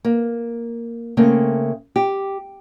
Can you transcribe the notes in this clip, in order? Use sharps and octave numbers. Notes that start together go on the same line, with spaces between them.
A#3
C#3 A3 A#3 C4
G4